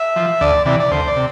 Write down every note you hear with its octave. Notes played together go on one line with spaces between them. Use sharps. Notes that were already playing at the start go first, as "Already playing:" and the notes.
Already playing: E5
F3
D2 D5
C3 E3 D5
D5
D2 C5
D5
C3